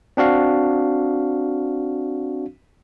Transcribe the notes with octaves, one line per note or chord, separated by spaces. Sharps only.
C4 D4 F#4 F5